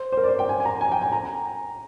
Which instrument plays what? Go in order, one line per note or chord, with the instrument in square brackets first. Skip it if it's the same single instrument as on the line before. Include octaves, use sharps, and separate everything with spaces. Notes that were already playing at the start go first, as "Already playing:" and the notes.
Already playing: [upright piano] C5
C5
A#4
D5
C5
G5
G#5
G#5
A#5
G#5
G5
G#5
A#5